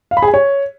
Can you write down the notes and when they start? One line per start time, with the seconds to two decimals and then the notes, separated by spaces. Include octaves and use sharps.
0.11 F5
0.17 B5
0.22 G#4
0.28 G#5
0.34 C#5